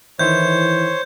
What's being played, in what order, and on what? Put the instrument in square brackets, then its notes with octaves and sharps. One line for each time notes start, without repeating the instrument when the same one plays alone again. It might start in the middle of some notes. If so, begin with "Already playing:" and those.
[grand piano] D#3 E4 [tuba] E3 [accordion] C5 C#5 [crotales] G6